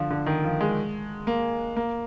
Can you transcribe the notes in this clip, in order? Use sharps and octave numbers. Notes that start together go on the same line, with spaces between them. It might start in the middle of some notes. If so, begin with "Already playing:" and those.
Already playing: D3 F3
D3
D#3
F3
G#3
A#3
A#3